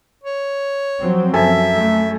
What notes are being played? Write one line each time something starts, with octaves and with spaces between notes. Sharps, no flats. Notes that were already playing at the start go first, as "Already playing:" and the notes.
C#5
F3 F#3 C4
F#2 A4 E5 G#5
A3